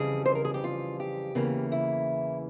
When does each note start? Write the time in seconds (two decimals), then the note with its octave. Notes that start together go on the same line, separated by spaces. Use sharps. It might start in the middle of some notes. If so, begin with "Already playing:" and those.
Already playing: F2 C#3 E3 G3 G#4
0.26 C5
0.35 A#4
0.45 G#4
0.54 G4
0.64 F4
1.00 G4
1.35 E2 C#3 E3 A#3
1.72 E4